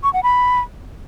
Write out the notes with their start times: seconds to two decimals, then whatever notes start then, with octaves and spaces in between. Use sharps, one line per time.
0.03 C#6
0.13 F#5
0.23 B5